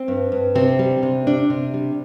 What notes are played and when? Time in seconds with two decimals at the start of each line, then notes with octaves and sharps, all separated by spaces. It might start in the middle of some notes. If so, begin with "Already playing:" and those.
Already playing: C4
0.08 G2
0.32 G2
0.55 C3 C4
0.79 G3
1.03 C3
1.27 G3 D4
1.50 C3
1.74 G3